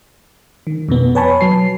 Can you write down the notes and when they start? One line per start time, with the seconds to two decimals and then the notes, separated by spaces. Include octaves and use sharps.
0.67 D#3
0.89 F2 B2 B3
1.15 B4 C#5 G#5 A5 B5 C#6
1.41 F#3 C7